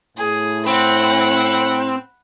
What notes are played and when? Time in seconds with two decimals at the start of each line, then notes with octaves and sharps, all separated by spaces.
0.17 A2 G#4
0.67 C4 F#5 B5